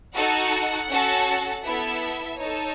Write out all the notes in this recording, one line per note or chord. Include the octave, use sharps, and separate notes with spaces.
D#4 F#4 A4 F#5
C#4 F#4 A4
B3 E4 A4 E5
D#4 A4 C#5